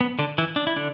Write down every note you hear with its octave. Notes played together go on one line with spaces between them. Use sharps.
B3
D3 D4
E3 E4
D4
E4
D3 D4